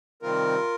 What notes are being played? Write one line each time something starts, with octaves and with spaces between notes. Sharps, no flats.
C3 D#3 G3 C4 F4 A#4